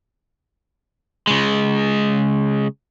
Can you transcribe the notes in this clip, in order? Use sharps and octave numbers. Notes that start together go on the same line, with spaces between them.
C#3 G#3